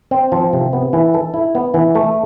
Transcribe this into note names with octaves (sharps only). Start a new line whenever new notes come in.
C4
F3
C3
B3
E3
A4
E4
B3
E3
A3